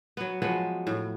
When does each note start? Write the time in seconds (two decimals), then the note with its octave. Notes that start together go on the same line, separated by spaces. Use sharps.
0.17 F#3 B3
0.42 F3 F#3 G#3 B3
0.87 A2